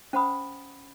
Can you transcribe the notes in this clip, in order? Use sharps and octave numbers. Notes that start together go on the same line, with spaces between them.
C#4 C5 F#5 B5 D#6